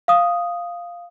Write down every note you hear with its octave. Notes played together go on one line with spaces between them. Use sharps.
F5 D#6